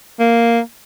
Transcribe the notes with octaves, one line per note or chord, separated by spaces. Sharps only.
A#3